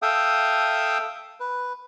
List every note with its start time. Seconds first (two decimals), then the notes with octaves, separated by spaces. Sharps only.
0.02 A4 E5 F5 G5 D#6
1.40 B4